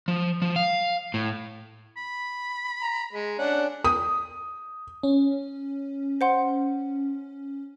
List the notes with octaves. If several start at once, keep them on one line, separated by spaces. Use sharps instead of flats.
F3
F3
F5
A2
B5
A#5
G#3
C#4 D4 F#5
D#6
C#4
C5 F#5 C6